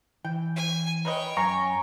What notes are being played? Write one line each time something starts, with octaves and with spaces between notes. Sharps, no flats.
E3 G5
G#5
A#4 B4 C#5 D#5 G5
F#2 F5 G#5 A#5 C#6